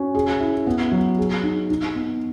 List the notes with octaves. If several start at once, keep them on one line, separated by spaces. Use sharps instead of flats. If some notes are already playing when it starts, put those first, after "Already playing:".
Already playing: C#4 F#4
G#4
E4
B3
F#3
G#4
D#4
D#4
B3